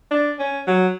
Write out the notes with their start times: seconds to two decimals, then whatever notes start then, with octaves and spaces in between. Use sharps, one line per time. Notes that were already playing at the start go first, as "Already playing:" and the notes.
0.11 D4
0.39 C#4
0.67 F#3